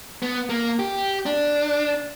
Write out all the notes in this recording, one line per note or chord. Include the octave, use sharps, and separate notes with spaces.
B3
A#3
G4
D4